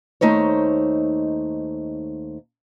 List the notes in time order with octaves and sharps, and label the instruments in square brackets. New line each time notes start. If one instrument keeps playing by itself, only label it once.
[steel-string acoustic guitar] D#2 A3 D#4 C5 C#5